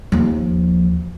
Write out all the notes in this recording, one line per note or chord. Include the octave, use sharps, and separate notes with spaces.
D#2 F3